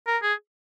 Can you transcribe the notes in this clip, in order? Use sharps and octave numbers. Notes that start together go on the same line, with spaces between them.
A#4
G#4